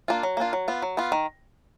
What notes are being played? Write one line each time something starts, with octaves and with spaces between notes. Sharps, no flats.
A#3 D4 F4
F#3
A#3 D4 F4
F#3
B3 F4
F#3
B3 F4
D#3